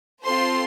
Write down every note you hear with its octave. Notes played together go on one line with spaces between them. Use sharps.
C4 F4 A4 C5 C6